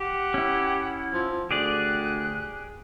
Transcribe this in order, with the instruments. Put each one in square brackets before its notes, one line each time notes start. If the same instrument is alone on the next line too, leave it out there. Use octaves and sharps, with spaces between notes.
[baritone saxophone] G4 [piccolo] F#5
[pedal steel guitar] C#4 E4
[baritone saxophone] F3
[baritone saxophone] D2 [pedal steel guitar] G4 G#4 D5 [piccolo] F#6